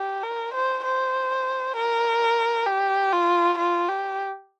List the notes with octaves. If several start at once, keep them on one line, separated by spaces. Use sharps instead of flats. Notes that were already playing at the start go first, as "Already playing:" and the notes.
Already playing: G4
A#4
C5
C5
A#4
G4
F4
F4
G4